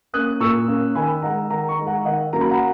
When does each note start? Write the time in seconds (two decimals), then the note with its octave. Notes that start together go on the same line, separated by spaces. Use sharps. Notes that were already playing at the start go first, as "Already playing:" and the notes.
0.13 A#3 C#4 D#6 F#6
0.40 A#2 C#6 E6
0.68 A#3 C#4
0.95 D#3 G#5 B5
1.22 G#3 D#4 F#5 A#5
1.50 D#3 F#5 A#5
1.69 A#5 C#6
1.78 G#3 D#4
1.87 F#5 A#5
2.05 D#3 D#5 F#5
2.33 F#3 A#3 C#4 A#5
2.41 B5
2.50 F#5 A#5